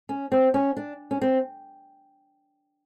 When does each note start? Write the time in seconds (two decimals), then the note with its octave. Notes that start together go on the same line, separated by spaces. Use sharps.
0.09 C#4
0.32 C4
0.54 C#4
0.77 D4
1.11 C#4
1.22 C4